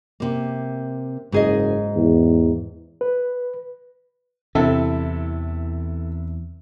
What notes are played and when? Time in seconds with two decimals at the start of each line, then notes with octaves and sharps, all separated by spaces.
0.20 C3 A#3
1.32 F#1 G#2 G#4 D#5
1.96 E2
3.01 B4
4.55 E2 C3 E3 E4 A4